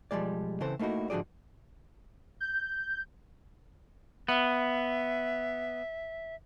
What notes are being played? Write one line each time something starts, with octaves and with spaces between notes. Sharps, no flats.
B1 F3 G3 G#3 D5
C#3 E3 C4 A4 C5
A3 A#3 D#4 E4 F#4
G#2 D3 F3 F#4 G#4 D5
G6
B3 E5